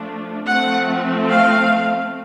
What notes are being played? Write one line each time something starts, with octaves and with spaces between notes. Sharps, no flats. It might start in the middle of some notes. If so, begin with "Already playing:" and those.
Already playing: F3 A3 D4
F3 A3 C4 F#5
F5